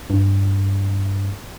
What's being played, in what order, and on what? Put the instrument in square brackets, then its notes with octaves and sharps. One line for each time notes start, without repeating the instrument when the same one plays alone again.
[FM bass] G2